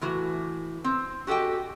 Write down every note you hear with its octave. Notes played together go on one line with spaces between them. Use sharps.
A2 E3 F#4
C4
F#4 G4 A4 D#5 G5